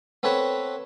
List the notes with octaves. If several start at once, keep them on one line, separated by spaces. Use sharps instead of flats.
B3 C4 A4 C#5 F#5 B5